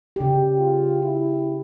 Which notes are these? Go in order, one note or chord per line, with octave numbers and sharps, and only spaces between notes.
C#3 G4
F4
E4